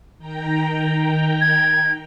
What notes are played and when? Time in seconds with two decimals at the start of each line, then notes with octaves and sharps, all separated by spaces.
0.18 D#3 G5 A#5
1.41 G#6